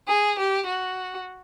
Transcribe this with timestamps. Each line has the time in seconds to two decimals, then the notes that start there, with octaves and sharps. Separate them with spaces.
0.09 G#4
0.38 G4
0.67 F#4